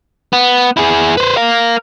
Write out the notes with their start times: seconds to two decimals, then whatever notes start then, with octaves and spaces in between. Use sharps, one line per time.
0.33 B3
0.77 E4 G#4
1.17 B4 C5
1.37 A#4 F5